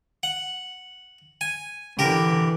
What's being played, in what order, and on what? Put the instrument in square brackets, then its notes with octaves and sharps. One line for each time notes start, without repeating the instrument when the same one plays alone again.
[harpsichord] F#5
G#5
[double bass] D3 E3 [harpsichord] G4 A#4